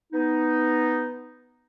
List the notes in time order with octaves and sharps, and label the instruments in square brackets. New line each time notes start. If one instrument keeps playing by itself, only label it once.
[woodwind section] B3 D#4